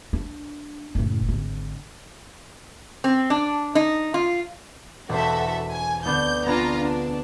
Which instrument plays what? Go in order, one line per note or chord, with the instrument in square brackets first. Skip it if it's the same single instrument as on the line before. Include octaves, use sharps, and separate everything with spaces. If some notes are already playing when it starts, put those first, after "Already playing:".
[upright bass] D4
F#1 A2
G#1 D3
[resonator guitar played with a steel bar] C4
D4
D#4
F4
[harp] E1 C5 [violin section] F#4 A4 E5
[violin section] G#5
[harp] D2 B3 D4 [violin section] G6
[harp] B3 G#4 [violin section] D4 F4 A#5
[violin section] D4